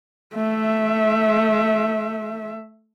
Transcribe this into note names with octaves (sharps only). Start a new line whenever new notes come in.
A3 E5